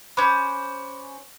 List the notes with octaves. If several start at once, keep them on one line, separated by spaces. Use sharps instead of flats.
C#4 C5 B5 D6 F#6